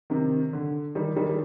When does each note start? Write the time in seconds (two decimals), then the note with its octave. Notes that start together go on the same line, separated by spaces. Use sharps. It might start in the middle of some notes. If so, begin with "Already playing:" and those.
0.10 C3 D#3
0.53 D3
0.95 D#3 G3
1.17 D#3 G3
1.30 G3